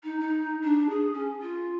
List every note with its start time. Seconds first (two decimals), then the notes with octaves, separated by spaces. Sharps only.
0.04 D#4
0.20 D#4
0.63 D4
0.89 G#4
1.13 C#4
1.42 F4